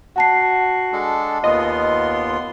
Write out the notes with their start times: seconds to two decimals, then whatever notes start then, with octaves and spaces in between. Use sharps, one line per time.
0.16 F#4 F#5 A5 C7
0.93 G#3 D4 A4
1.44 D#2 B3 F4 D#5 C6